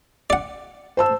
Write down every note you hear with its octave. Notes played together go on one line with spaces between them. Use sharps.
D5 F#5
C5 A5 E6